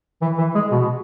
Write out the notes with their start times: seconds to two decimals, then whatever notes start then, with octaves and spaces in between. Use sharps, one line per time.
0.22 E3
0.38 E3
0.55 G#3
0.72 B2